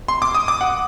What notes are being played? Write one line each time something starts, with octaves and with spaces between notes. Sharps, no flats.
C6
D6
D#6
D6
F#5